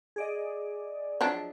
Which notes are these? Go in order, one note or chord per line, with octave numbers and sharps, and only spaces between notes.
G#4 D5 D#5
F3 F#3 D4